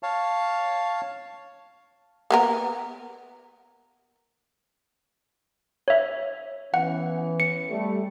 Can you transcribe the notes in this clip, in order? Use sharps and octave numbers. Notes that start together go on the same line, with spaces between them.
C#5 F5 A5
A#3 B3 A#4
C#5 E5
E3 B3 C#4 F#5
C#7
G3 A3